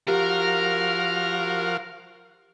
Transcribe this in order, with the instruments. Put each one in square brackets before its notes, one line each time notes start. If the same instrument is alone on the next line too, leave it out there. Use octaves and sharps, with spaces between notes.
[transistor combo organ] F3 F#4 F5 [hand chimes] G4 [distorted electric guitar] A#4